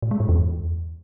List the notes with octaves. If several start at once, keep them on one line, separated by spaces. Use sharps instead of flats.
A2
G#3
G#2
E2